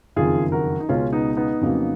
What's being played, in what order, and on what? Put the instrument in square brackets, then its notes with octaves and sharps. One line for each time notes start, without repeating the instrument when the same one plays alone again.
[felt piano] F#1 F2 D#3 [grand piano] F4 G#4
[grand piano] F#4 A#4
D#4
[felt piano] C#2 B2 G#3 [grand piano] C#4 F4
[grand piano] B3 D#4
B3 D#4
[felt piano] F2 C#3 F#3 A#3